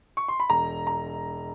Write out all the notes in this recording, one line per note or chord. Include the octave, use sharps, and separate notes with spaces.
C#6
C6
B5
E1 A#5
A#5